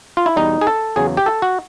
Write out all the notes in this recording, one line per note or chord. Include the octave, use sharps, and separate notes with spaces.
F4
E4
E2 B2 G3 D#4
G#4
A4
E2 C#3 F#3 G#4
G4
A4
F#4